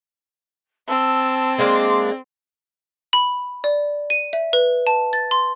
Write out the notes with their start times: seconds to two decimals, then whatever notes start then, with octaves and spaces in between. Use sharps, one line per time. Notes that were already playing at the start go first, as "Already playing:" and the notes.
0.88 C4 A5 E6
1.58 G#3 A#3 D4 C6
3.13 B5
3.64 D5
4.10 D#7
4.33 E5
4.53 B4
4.87 A5
5.13 A6
5.31 C6